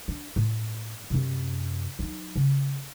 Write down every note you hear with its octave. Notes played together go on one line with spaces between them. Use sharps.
D4
A2
F#2 C3
F#3 D#4
C#3